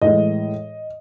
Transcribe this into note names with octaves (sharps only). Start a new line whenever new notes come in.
A2 E3 G#3 D#5